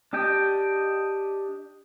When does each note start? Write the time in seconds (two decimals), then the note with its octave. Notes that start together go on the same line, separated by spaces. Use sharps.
0.13 D4 G4 D#5 G5